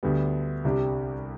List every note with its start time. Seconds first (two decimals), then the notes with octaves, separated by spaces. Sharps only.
0.03 D2 D3 G3 B3
0.64 C2 C3 G3 D4 G4